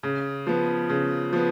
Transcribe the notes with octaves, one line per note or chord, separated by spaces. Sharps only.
C#3
F3 B3
C#3
F3 B3